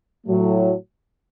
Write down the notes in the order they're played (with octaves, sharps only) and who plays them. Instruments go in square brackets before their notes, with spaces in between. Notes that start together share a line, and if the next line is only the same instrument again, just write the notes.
[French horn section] A2 F#3 A3